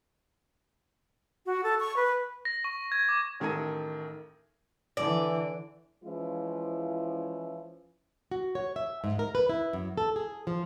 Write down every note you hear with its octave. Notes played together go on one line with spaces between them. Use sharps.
F#4
A4
C#6
B4
A#6
C#6
G#6
D6
A1 D#3 A4 A#5 G#6 D#7
D3 E3 D5
E3 F3 G#3 C#4 E4 F4
F#4
C#5
E5
G#2
A#4
B4
E4
F#2
A4
G#4
F3